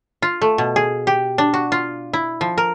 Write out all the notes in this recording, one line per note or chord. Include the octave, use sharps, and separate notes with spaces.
F4
A3
B2
G#4
G4
D4
F#4
F4
E4
F3
A#4